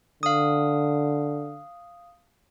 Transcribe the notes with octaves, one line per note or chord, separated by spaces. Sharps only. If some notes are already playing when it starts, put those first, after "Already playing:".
D3 F5 D#6